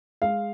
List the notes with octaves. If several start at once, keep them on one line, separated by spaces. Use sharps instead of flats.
G#3 F5